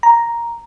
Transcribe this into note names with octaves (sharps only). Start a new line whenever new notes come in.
A#5